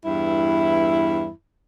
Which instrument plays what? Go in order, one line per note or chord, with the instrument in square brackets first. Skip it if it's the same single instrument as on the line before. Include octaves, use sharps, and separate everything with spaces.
[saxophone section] E2 G2 E4